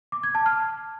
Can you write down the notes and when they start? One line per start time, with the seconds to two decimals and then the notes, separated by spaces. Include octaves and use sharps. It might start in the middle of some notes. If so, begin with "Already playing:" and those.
0.12 D6
0.23 G#6
0.35 A5
0.46 F6